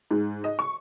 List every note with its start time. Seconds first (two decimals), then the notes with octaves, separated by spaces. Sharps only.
0.11 G#2
0.44 D#5
0.59 C#6